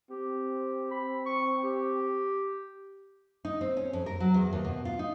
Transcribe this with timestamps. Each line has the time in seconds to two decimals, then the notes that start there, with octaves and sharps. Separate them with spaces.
0.10 C4 G4
0.91 B5
1.26 C#6
1.63 G4
3.45 D#4
3.61 C4
3.77 C#4
3.93 F2
4.06 A#4
4.20 F#3
4.34 E2
4.53 D#2
4.65 B2
4.85 F4
4.99 D#4